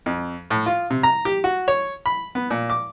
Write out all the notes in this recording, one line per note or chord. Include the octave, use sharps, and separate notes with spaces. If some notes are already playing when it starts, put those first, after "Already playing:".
F2
A2
F4
C3
A#5
G4
F#4
C#5
B5
B3
A#2
D6